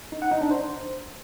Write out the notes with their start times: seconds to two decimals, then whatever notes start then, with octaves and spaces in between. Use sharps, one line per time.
0.12 D#4
0.22 F#5
0.32 D#4
0.41 D4
0.51 C5